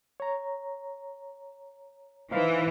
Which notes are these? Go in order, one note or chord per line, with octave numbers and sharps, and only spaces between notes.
C#5 A#5
E3 D#4 C5 F5